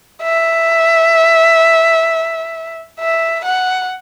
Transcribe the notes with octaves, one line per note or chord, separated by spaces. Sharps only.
E5
E5
F#5